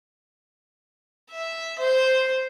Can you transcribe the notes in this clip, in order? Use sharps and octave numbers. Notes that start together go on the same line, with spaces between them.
E5
C5